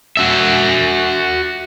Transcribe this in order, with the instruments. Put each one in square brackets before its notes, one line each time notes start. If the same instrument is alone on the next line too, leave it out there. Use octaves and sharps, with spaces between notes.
[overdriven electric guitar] F#4 E5